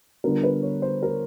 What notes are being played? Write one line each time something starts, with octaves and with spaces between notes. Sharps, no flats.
D3 G3 B3 D4 F4 A#4
B4
C#5
C5
A#4